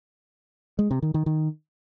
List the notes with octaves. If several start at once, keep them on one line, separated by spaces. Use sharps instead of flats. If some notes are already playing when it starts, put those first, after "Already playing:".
G#3
C3
D#3
D#3
D#3